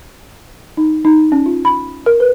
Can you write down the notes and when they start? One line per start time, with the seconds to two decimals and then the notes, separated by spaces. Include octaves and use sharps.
0.77 D#4
1.05 D#4
1.32 C#4
1.46 F4
1.65 B5
2.06 A#4
2.20 B4